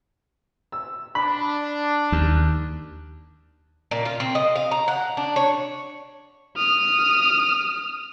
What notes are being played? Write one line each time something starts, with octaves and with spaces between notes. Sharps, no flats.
E6
D4 B5
D#2
A#2
F4
C4
D#5
F5
A#5
F#5
D4
C#5
D#6 F6